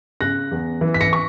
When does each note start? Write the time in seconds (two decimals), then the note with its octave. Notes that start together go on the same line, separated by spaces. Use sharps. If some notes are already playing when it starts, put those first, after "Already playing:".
0.21 C#3 F#6 A#6
0.51 E2
0.81 E3
0.94 B6
1.01 A#6 C#7
1.13 C#6